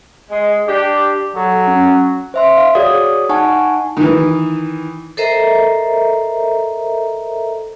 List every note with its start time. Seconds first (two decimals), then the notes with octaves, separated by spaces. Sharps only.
0.30 G#3
0.67 D4 G4
1.36 F#3 A4
1.67 C#4
2.34 C5 E5 C6
2.57 F5
2.75 F#4 G#4 C#5 D5 D#6
3.29 D#4 F#5 G#5 A5 C#6
3.97 D#3 E3
5.17 A4 A#4 C5 D#5 E5 A#5